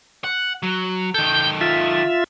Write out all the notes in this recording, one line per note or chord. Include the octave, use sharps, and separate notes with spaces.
F#5
F#3
D#3 A4 G6
F4 E5